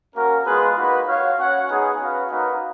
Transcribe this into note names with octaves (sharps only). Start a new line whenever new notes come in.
A#3 C#4 F#4 A#4
G#3 B3 F4 G#4 B4
A#3 D#4 F#4 B4
F#4 C#5 F5
C#4 F#4 C#5 F#5
B3 D#4 G#4 C#5
C#4 F#4 B4 F5
A#3 D#4 F#4 B4 F5